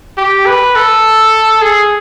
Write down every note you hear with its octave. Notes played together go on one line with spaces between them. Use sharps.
G4
B4
A4
G#4